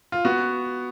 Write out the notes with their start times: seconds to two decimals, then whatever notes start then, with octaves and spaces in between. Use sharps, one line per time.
0.12 F4
0.25 B3 F#4